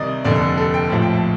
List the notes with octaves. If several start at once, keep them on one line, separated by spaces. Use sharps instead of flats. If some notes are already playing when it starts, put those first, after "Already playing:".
Already playing: C2 C3 D#3 D5 D#5
F1 D#2 D3 D5
A4
A4
G5
A#1 A2 F3 A5
G5
A5